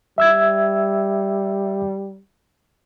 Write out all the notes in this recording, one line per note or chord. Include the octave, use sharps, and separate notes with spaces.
G3 E5 E6 G#6